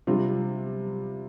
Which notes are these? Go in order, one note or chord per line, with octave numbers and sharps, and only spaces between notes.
C3 G3 D4 F4